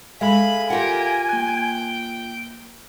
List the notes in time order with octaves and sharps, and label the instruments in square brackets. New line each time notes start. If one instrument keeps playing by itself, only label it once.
[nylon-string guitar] G#3 [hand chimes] A4 E5 F5 [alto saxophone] G#5 [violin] B5
[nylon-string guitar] F4 F#5 [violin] G4 A#4
[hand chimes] A#3 F#6 [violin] G5